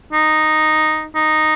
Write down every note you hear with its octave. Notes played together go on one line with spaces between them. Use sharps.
D#4
D#4